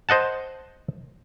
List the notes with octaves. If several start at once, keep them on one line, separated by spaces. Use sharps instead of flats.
C5 D#5 F#5 A5